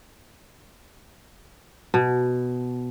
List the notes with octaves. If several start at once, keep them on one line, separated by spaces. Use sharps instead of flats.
B2